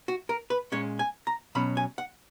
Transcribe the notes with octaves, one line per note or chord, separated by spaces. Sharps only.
F#4
A#4
B4
A#2 G#3 C#4 C#5
G#5
A#5
B2 F#3 C#4 B5
G#5
F#5